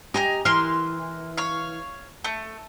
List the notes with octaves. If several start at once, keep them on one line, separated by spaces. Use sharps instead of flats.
G4 D#5 G#5 A#5
E3 A#4 C6 F6
C#5 F5
A3